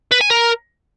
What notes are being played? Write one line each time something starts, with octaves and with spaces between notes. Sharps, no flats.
B4
G#5
A#4